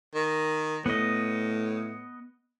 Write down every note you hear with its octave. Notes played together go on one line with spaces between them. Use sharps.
D#3
A2 B3 D#5